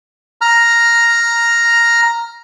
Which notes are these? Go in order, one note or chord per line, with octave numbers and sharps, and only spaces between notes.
A#5 F6